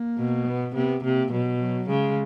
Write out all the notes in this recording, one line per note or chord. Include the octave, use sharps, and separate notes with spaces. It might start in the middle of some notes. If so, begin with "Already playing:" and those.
Already playing: A#3
B2
B3
C3 B3
C3 A#3
B2 F#3
F#3
C#3 G#3